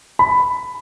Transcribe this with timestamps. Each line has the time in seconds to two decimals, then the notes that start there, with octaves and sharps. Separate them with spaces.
0.19 B5